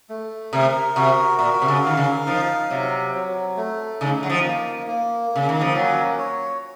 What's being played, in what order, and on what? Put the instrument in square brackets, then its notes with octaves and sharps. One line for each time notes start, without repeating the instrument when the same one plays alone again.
[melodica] A3
[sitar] C3 [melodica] A#4
[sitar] C3 [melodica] F#4
[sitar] A#2 [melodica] A#4
[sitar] C3
C#3
[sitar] D#3 [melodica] F5
[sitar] C#3
[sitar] F3 [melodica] D#4
[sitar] C3 [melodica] F#3
[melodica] F#3
A3
[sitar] C#3 [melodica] D#4
[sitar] F#3
F3
[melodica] A#3
A#3
[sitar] C#3 [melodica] A#3
[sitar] D#3
F3
[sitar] F#3 [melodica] C#4
[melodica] C#5